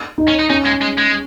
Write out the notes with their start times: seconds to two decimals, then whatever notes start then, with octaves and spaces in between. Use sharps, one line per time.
0.18 D#4
0.28 C#4
0.39 D#4
0.50 C#4 D#4
0.66 G#3
0.81 G#3
0.98 G#3